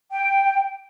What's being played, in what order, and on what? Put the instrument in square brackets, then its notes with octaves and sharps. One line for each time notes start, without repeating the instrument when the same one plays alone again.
[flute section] G5